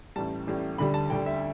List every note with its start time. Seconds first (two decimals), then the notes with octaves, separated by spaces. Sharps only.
0.16 A1 A2 G3 A5
0.47 A1 A2 G3
0.78 D2 D3 G3 B5
0.94 A5
1.10 D2 D3 G3 G5
1.26 E5